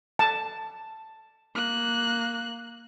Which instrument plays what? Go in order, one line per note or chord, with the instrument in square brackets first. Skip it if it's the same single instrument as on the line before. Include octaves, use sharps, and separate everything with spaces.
[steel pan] A5
[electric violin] A#3 F#6